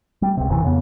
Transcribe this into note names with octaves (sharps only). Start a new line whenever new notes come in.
G3
C#2 C3
F#1 D#2 C3 E3
F2 C#3 B3